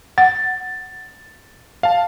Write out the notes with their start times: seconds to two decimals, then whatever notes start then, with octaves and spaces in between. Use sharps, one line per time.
0.18 F#5 A6
1.83 F5 A5